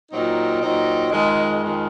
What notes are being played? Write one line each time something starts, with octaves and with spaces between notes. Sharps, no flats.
A#2 F#3 C4 D#4
A#2 F#3 C4 D#4
F2 D#3 G#3
F2 D#3 G#3